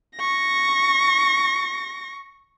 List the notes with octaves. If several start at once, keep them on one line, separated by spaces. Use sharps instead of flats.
C#6 A#6